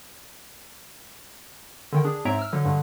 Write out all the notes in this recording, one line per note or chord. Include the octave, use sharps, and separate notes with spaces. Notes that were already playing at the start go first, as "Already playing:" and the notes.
D3 D#3 G5
D4 G#4
G#2 C4 C#5 E5 A#5 D7
E6 F6
D3 F#3
G2 D3